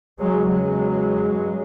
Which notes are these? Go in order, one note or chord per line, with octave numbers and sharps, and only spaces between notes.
E2 C#3 F#3 G#3
F#3 G#3
G2